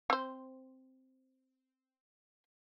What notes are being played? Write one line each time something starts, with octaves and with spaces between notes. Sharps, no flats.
C4 C5